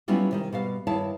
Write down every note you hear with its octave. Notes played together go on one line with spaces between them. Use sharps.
F#3 G3 B3 C#4 E4 F4
C3 D#3 G3
B2 G3 F5
G2 D#3 E4 C#5 F5 A5